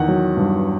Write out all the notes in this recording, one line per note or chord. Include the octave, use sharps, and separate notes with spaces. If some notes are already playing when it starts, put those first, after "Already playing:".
Already playing: E2 D#3 F#5
F#3
G2